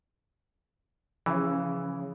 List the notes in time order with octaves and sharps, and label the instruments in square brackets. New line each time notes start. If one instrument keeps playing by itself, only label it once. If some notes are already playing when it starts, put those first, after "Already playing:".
[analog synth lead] C#3 [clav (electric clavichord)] E3 [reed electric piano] F3 C#4